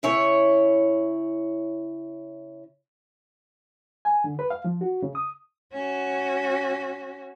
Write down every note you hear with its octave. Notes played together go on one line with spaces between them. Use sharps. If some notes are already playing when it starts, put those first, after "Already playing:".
C#3 E4 C#5
G#5
D3
B4
F5
F3
F#4
C#3
D#6
C#4 F#4